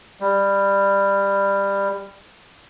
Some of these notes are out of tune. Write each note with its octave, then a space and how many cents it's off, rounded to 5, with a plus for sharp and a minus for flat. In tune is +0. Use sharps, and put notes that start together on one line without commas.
G3 +15